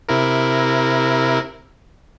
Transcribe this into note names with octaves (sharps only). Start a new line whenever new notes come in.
C3 E4 A#4